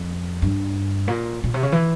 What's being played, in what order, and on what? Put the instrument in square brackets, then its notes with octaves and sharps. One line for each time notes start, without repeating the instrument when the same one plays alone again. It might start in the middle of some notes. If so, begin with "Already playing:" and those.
Already playing: [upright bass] F2
G2
A#2
A#2
C3
C#3
E3